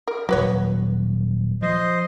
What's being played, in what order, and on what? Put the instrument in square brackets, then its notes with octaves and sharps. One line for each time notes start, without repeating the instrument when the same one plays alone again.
[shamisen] A#4
[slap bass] D#1 F#3 [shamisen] F#4 B4 C#5
[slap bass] F3 [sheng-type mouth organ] C5 D#5